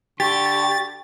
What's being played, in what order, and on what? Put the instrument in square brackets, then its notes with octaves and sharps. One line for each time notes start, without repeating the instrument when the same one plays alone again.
[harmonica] D3 C#6 [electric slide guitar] G4 [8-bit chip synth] A6